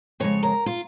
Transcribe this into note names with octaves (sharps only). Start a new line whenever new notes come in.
F2 C#3 G#3 C#5
A#4
F4